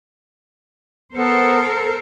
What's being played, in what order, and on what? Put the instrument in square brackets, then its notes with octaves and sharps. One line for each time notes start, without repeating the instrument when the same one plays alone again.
[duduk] B3 [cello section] A4 A#4 C5